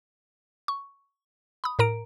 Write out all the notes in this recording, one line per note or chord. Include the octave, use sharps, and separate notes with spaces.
C#6
B5 D#6
A2 A#4 A#5 D7